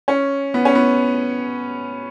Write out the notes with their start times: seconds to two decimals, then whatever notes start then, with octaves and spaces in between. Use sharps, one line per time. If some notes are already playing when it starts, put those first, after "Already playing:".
0.08 C#4
0.54 B3
0.65 C#4
0.75 B3